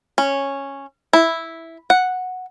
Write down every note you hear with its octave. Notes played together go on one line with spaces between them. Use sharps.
C#4
E4
F#5